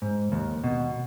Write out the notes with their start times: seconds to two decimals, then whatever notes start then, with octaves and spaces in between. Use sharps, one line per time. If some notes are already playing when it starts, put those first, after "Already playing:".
0.02 G#2
0.32 D#2
0.64 B2